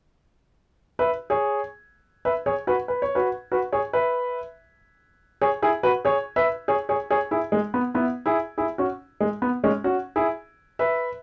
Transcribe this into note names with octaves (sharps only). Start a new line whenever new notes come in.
B4 E5
G#4 C#5
B4 E5
G#4 C#5
F#4 B4
B4
C#5
F#4 B4
F#4 B4
G#4 C#5
B4 E5
G#4 C#5
E4 G#4
F#4 B4
G#4 C#5
B4 E5
G#4 C#5
G#4 C#5
G#4 C#5
E4 G#4
G#3
B3
B3 E4
E4 G#4
E4 G#4
C#4 F#4
G#3
B3
G#3 C#4
C#4 F#4
E4 G#4
B4 E5